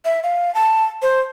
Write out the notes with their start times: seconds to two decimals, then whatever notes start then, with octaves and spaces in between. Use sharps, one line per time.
0.05 E5
0.23 F5
0.55 A5
1.02 C5